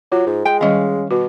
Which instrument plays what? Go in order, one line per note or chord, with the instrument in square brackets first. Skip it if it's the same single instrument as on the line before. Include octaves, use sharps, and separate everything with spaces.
[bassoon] F#3 [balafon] F4
[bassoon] G#2
[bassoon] G#3 [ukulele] G5
[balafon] D#3 G3 D#5 [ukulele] C#4 F5
[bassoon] B2 [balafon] F#4